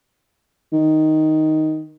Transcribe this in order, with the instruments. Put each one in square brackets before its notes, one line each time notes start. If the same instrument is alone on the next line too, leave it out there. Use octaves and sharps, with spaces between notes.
[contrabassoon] D#3